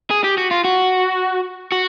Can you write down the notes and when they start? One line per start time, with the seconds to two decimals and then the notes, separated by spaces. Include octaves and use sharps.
0.10 G#4
0.24 G4
0.38 F#4
0.51 F4
0.64 F#4
1.72 F#4